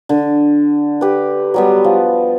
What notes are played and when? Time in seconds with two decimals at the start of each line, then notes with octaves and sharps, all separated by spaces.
0.09 D3
1.01 G4 B4
1.54 F#3 G3 B3
1.84 F3